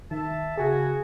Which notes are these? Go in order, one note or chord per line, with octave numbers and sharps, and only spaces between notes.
D#3 E5 A5
C#3 F#4 G#4 G#5